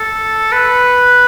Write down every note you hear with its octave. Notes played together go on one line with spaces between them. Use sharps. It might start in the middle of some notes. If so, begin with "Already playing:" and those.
Already playing: A4
B4